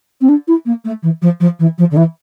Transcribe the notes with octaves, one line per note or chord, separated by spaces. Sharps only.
C4
D4
E4
A#3
A3
E3
F3
F3
E3
F3
D3
E3